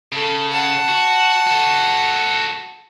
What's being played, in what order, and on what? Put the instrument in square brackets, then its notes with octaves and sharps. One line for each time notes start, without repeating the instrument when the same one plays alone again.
[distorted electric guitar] C#3 [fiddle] A4
[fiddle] F#5 A5
[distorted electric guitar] F#4
F#4 A4